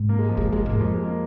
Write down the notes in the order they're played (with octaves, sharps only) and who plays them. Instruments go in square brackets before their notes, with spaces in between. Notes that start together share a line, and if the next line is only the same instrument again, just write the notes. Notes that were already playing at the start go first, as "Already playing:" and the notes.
Already playing: [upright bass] G#2
[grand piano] A#3
G#3
F3
[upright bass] F2 [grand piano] G#3
[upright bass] F2 [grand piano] G#3
[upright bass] G#2 [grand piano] A#3
[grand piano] G#3
[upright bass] F2 [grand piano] F3
[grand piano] G#3
A#3